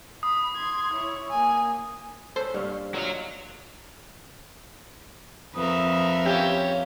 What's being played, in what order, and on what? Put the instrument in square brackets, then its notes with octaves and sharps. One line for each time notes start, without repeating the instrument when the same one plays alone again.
[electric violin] B5 [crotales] D#6
[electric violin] C6 G#6
E4 C#5
A#3 G#5
[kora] C#4 B4 [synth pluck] A4 C5
[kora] G2 A#3 C#5
[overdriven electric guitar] F#3 F#5 [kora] F4 D#5 F5
[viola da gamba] F2 A#4 [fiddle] B4 E5 [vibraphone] D#6
[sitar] C#4 G4 [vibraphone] F5